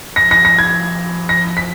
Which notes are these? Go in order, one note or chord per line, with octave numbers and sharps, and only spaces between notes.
F3 A#6
A#6
A#6
G#6
F3 A#6
B6